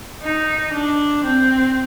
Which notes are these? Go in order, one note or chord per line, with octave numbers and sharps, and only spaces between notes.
D#4
D4
C4